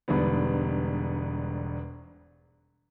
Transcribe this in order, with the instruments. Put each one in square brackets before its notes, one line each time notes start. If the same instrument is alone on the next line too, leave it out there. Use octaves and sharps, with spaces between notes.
[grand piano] E1 G#2 D3 G3 B3